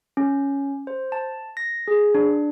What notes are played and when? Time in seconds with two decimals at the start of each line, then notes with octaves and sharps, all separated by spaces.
0.17 C#4
0.87 C5
1.12 A5
1.57 A#6
1.88 G#4
2.15 D4